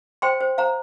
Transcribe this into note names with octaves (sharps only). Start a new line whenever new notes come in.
C5 G5 C6
C5
C5 F5 A#5